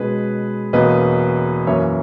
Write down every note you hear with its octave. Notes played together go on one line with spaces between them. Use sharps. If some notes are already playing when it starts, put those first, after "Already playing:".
Already playing: B2 G#3 C#4 G#4 B4
E2 B2 A#3 C#4 B4 D#5
F#2 E3 A#3 C#4 C#5 E5